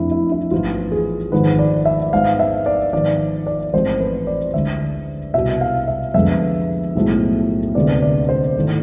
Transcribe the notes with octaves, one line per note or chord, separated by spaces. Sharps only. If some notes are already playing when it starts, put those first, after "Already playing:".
Already playing: F2 E3 A3 C4 D4 E4
E4
E4
A1 G#2 F3 B3 F4
G#4
G#1 G#2 F3 B4
D5
E5
G#2 G#3 B3 F5
E5
D5
G#1 G#2 F3 B3 D5
D5
A1 G#2 F3 G#3 C4 C5
B4
D5
D2 D3 G#3 E5
C2 B2 B3 E5
F5
E5
F2 D3 G#3 B3 E5
B1 A2 F3 G#3
D2 C3 G#3 B3 D5
D5
C5
G#1 G#2 E3 A3